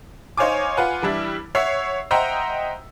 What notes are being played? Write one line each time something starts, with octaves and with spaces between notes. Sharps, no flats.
D#4 C5 C#5 F5 G#5 D6
F4 B4 F#5 G#5
E3 G3 D4 E4
C#5 E5 F#5 C7
C5 D#5 E5 F#5 G5 A#5